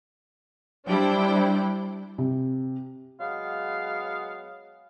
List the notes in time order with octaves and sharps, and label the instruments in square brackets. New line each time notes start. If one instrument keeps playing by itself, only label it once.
[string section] G3 D4 E4 C5 G5
[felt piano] C3
[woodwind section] F#3 G#3 B3 F5